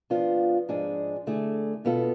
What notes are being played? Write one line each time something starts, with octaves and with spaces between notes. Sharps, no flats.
F3 B3 D4 F4
G#2 F3 G#3 D4 G#4
D3 A3 E4 G#4
B2 B3 F4 A4